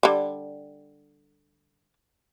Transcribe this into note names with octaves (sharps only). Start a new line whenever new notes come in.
D3 G3